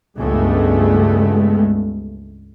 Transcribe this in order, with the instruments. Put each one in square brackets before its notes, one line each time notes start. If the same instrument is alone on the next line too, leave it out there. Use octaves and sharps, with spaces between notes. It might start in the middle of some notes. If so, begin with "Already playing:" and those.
[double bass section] C#2 G2 G#3 A3 B3